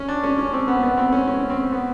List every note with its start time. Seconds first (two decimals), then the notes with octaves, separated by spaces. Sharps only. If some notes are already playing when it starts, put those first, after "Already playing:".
Already playing: C#4
0.08 D4
0.24 C#4
0.38 C#4
0.53 C4
0.68 B3
0.83 B3
0.98 C4
1.13 C#4
1.27 C#4
1.50 C4
1.72 B3